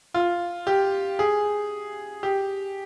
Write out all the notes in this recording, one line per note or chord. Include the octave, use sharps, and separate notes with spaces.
F4
G4
G#4
G4